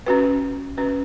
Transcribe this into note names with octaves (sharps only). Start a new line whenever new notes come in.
C#4 F#4 B4
C#4 F#4 B4